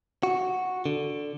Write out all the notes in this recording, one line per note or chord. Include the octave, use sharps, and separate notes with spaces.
F#4
D3